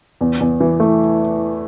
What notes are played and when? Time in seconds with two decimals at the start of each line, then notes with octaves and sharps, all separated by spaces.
0.21 E2
0.41 E2
0.60 E3
0.80 A3